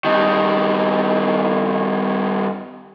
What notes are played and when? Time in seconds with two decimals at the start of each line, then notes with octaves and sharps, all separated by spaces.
0.05 G2 D#3